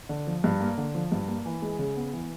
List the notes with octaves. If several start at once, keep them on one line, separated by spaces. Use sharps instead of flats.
D3
F3
G2
A#3
D3
F3
G2
A#3
E3
G#3
C#3
B3
E3